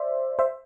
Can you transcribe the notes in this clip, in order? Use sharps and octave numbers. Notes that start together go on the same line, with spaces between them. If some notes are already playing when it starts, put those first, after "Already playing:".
Already playing: C5 D5 E5
C5 E5